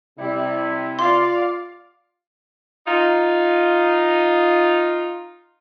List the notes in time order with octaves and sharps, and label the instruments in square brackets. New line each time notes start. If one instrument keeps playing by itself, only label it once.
[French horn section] C3 [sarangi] G3 [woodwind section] E4
[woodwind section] F4 D5 [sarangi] F5 [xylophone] C6
[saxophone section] D#4 F4